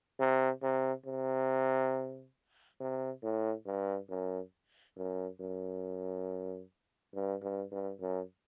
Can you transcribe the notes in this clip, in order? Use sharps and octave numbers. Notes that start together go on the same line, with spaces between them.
C3
C3
C3
C3
A2
G2
F#2
F#2
F#2
G2
G2
G2
F#2